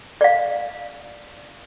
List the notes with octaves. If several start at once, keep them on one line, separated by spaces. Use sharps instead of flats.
D5 F5